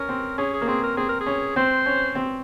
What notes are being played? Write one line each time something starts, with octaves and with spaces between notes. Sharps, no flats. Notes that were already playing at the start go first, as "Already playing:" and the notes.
Already playing: C#4 A#4
C4
C#4 G#4
G#4
A#3
C4 G#4
A#4
C4 G#4
A#4
G#4
C#4
C4 C5
C#4
C4